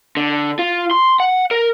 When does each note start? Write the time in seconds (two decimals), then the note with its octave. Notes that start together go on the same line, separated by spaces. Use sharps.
0.17 D3
0.59 F4
0.91 C6
1.20 F#5
1.51 A#4